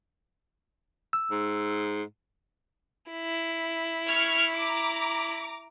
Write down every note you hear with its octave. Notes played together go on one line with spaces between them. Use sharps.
E6
G#2
E4
C#6 F6 G#6
A#5 D6